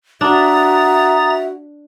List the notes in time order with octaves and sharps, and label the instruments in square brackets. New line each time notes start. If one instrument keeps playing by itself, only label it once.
[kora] D4 [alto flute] F#4 [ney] E5 [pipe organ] A#5 D#6 A6